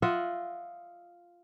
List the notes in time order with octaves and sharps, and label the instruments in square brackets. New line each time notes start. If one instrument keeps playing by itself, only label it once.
[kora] F4 D#5 E5 F#5